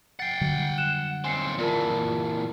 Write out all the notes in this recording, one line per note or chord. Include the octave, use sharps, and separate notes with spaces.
F#5 G5 A6 C7
D3 F#3 G3
F#6 E7
D#2 C4 G#5 C7 C#7
A#2 E3 F4 A#4 A5